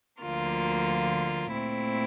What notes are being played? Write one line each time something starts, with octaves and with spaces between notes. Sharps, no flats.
D2 D3 F3 A#3 F4
A#2 A3 C4 E4